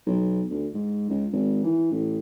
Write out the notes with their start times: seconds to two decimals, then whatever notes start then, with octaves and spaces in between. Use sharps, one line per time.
0.06 B1
0.50 D2
0.74 G#2
1.10 C#2
1.32 G#1
1.64 E3
1.91 A1